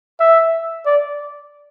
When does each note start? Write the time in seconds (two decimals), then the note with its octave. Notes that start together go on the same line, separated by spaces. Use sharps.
0.20 E5
0.86 D5